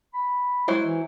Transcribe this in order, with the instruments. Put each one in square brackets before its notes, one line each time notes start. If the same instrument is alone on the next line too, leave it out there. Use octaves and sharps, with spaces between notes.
[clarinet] B5
[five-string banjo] F#3 E4 C5 [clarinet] G#3
[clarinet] E3